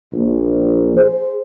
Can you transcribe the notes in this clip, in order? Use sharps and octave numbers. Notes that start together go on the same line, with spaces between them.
A#1
G#4 C5